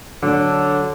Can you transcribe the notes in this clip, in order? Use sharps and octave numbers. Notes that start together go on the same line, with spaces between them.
D3 F#3 D4